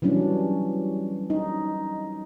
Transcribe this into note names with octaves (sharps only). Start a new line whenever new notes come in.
E3 F#3 G3 C#4 D4
D#4